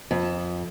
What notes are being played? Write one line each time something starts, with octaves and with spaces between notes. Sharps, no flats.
F2